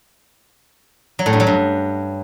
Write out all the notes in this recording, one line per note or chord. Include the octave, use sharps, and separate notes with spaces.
F#3
A2
G2
F#3
G2